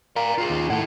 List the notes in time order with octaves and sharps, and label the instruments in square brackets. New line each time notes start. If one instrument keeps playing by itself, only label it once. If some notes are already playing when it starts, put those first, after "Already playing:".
[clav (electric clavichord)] A#4 [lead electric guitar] D5 F5
[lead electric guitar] F4 G#4
[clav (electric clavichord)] D#2
[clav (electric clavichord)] A2 F#5 [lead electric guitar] E4 A4